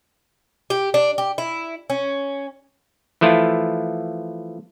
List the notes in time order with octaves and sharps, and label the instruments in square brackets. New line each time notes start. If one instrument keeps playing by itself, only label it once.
[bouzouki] G4
D4
G4
E4
C#4
[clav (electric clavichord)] E3 F3 A3 E4 F4